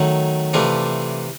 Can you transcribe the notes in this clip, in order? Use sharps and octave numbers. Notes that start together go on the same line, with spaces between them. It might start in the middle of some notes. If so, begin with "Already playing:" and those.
Already playing: D#3 F#3 A3
C3 E3 A3 D4 F4